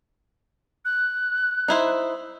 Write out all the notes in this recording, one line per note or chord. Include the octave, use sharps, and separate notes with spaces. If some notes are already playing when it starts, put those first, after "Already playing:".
F#6
D#4 E4 C5